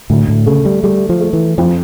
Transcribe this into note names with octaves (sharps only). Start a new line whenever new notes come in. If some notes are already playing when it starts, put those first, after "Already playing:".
D2 A2
A2
C#3 A3
G3
G3 A3
F3
A3
E3
F2 F3